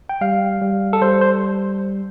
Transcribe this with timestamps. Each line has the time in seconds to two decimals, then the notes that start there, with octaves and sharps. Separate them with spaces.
0.09 G5
0.21 G3 F5
0.62 G3
0.93 A4
1.01 G3 C5
1.21 C5